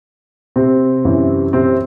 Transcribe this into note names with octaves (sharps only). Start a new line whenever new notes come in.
C3 C4
F#2 E3
C3 C4